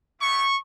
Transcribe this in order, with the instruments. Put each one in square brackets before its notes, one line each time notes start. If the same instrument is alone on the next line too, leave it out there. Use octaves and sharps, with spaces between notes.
[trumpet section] B3 E4 G4 C#6